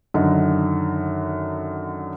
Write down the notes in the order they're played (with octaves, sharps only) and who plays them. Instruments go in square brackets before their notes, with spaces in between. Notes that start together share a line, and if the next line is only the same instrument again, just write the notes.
[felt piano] F#2 D3 D#3 D#4